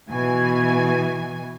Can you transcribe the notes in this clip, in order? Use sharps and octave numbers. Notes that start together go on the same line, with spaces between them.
B2 E3 G#5